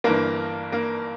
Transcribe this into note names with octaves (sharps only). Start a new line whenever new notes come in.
G1 G2 E3 A#3 A#4
A#3 A#4